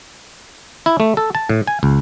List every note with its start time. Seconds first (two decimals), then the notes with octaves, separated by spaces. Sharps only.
0.86 E4
1.00 A3
1.17 A4
1.35 A5
1.50 A2
1.67 G#5
1.83 C#2